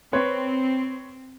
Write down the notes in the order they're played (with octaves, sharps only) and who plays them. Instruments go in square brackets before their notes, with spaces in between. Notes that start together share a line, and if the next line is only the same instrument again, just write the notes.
[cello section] C4 [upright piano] B4 C#5 C6